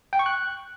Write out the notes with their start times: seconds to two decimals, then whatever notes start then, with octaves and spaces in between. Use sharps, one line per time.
0.13 G5
0.19 C#6
0.26 F#6